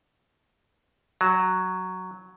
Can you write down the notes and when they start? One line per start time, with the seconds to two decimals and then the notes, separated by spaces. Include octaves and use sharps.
1.21 F#3